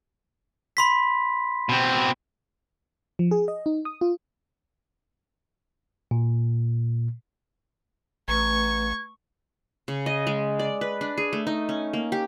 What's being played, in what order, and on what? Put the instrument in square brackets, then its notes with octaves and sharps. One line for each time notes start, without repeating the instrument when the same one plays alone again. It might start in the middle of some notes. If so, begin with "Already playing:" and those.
[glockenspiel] B5 C6 B6
[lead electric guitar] B2 C4
[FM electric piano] F3
G#4
D#5
D#4
D#6
F4
[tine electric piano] A#2
[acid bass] A1 [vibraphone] A3 B4 A#5 [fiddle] C#6 [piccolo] G#6
[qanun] C#3
D#5
G#3
D5
B4
D4
G#4
A3
D#4
C#4
A#3
G4